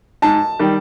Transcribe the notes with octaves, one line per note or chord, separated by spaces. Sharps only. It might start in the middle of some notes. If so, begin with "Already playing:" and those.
G#2 A5
D#3 G3